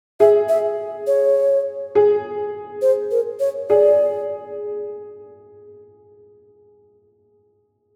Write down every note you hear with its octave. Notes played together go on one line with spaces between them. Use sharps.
G#4 E5
E5
C#5
G#4
C5
A#4
C#5
G#4 D5